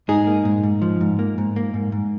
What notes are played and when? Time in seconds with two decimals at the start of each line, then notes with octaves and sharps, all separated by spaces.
0.08 G#2 D#4 G#4
0.27 A#3
0.45 G#2
0.63 G#2
0.82 F3
1.01 G#2
1.19 A#3
1.38 G#2
1.56 A#3
1.74 G#2
1.92 G#2